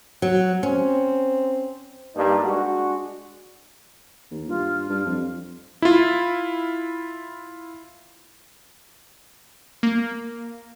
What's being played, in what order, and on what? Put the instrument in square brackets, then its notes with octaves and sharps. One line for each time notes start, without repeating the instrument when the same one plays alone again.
[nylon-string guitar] F#3
[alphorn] C4 [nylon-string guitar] C#4
[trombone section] G2 G3 A#3 D4 D#4
G#3 D4 F#4
[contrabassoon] D#2
[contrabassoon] G2 [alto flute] F4
[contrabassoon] G2
F2
[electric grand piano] E4 F4
[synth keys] A#3